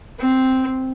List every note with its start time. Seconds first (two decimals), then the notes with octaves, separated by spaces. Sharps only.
0.20 C4